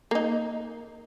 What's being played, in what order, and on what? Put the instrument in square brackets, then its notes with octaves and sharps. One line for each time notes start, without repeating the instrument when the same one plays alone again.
[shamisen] A#3 D#4